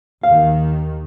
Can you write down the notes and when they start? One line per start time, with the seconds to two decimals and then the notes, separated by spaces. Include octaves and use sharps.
0.23 D#2 D#3 F5